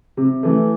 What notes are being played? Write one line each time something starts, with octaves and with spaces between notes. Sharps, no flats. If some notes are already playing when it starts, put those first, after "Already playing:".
C3
E3 A3